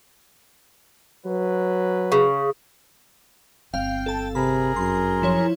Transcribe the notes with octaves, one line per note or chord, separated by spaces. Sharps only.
F#3 B4
C#3
G1 C4 F5 G5
A4 A5
C3 G#4 A#4 B5
F#2 C6
F3 E4 C#5